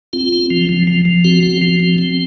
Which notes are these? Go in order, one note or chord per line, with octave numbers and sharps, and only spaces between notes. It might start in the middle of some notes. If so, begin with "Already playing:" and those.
C4 F4
C4
F3
F3
F3
F3
C4 F#4
C4
F3
C4
C4